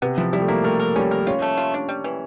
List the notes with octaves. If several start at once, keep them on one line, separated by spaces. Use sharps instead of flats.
C3 B3
F3 E4
G3 E4
A3
A#3 E4
A3 A#4
A#4
G3 C#4
A#4
C#4 F4
A3
F4
D4
G3
E3